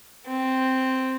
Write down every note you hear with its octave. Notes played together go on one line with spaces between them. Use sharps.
C4